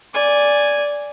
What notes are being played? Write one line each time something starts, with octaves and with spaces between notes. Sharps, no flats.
D5 G#5